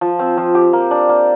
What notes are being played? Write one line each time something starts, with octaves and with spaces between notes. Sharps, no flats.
F3
C4
F3
G4
A#3
D4
A#3